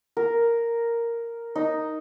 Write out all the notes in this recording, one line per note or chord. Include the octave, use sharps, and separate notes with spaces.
A#4
D#4